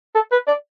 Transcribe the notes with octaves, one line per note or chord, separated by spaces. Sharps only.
A4
B4
D5